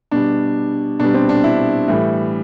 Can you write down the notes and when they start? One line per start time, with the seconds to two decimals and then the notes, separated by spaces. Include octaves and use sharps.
0.11 B2 G3 D4
1.00 B2 G3 D4
1.14 C4
1.29 D4
1.44 E4
1.88 A2 E3 G3